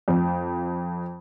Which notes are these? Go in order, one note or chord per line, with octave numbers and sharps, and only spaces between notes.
F2